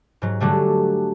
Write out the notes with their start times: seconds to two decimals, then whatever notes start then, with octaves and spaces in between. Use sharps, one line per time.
0.22 G#2 F#3
0.40 D3 F#3 G3 A3